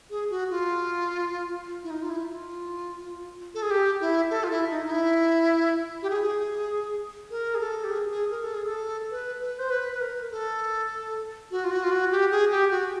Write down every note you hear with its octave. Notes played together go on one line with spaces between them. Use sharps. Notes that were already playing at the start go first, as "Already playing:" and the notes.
G#4
F#4
F4
E4
D#4
F4
E4
F4
A4
G#4
G4
E4
A4
F4
E4
D#4
D#4
E4
G4
G#4
A#4
G#4
A4
G4
G#4
G#4
A#4
A4
G#4
A4
B4
B4
C5
B4
B4
A#4
A4
F#4
F4
F#4
F4
F#4
G4
G#4
G4
F#4